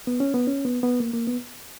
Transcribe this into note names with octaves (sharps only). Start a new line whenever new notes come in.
B3
C#4
B3
C#4
B3
B3
A#3
A#3
B3